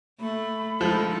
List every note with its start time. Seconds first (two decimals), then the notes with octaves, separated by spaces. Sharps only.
0.20 A3 B5
0.81 F3 G#3 D#4 A4